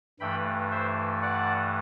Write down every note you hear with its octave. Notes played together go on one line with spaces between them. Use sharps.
G2 E3 A3 G5 B5
C5 E5
D5 F#5